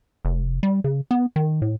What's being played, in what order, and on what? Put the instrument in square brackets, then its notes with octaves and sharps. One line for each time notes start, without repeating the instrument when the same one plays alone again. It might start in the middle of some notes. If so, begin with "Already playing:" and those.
[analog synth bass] F1
G3
C#3
B3
D#3
A2